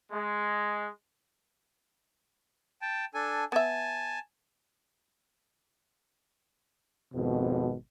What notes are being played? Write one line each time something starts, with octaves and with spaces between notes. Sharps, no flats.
G#3
G5 A5
D4 A4 G#5
B3 E5 G#5 A5
G#1 F2 B2